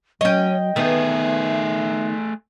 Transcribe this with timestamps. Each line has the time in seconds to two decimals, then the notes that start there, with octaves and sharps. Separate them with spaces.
0.21 F#3 C#4 C#5 D#5 G5
0.76 D#3 A3 B3 G#4 E5